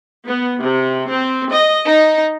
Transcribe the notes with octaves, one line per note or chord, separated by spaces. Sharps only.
B3
C3
C4
D#5
D#4